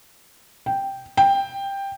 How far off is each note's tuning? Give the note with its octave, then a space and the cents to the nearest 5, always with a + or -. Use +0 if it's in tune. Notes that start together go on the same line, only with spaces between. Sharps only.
G5 +0
G5 +10